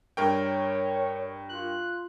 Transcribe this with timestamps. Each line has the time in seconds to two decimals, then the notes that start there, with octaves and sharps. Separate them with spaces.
0.17 G2 A#4 C#5 G5
1.49 F4 F#6